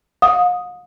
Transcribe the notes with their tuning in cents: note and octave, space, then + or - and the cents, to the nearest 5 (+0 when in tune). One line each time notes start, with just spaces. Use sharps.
F5 +45 D#6 +0